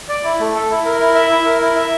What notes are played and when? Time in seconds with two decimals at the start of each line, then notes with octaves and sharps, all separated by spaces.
0.09 D5
0.24 E4
0.40 A3
0.54 A4
0.70 E4
0.85 A#4
1.00 E4
1.15 E5
1.30 E4
1.45 A#4
1.61 E4
1.76 E5